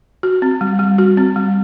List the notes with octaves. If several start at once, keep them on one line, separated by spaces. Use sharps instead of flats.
F#4
C4
G3
G3
F#4
C4
G3